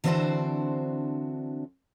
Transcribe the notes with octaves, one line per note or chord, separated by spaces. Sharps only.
D3 E3 C4 D4 F#4 C5